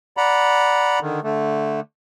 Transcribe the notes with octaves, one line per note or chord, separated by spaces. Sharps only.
D5 F#5 A#5 B5
D3 D#3
D3 A3